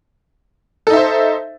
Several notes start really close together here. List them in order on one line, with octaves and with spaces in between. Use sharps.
A4 D#4 E5 C5